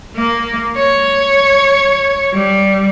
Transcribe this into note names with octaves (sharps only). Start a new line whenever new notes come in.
A#3
C#5
G3